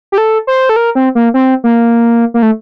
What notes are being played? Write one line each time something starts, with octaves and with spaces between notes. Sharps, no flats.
G4
A4
C5
A4
A#4
C4
A#3
C4
A#3
A#3
A3